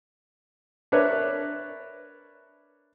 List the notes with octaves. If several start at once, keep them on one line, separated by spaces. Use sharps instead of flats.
D4 A#4 B4 C#5 E5